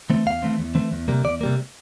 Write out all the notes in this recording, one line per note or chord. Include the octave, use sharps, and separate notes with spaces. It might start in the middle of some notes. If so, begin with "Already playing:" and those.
E3 A3 C4
E2 F5
E3 A3 C4
E2
E3 A3 C4
E2
C3 G3 A#3
E2 D5
C3 G3 A#3